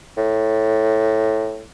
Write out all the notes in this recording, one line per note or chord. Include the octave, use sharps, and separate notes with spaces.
A2